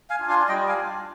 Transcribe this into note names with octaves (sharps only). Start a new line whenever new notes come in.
F5 G#5
D4 F4
F5 G#5
G3 D#5 G5
F5 G#5
D4 F4